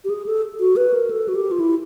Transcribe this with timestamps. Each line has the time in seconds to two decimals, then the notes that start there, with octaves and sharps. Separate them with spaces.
0.04 G4
0.10 G#4
0.26 A4
0.60 F#4
0.76 B4
0.94 A#4
1.11 A4
1.28 F#4
1.35 G4
1.51 F4
1.60 E4